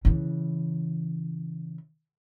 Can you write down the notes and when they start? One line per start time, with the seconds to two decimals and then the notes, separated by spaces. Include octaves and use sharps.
0.05 C#3 E3